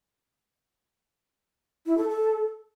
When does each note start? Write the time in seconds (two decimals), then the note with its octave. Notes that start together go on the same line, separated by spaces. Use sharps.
1.86 E4
1.98 A4
2.09 A4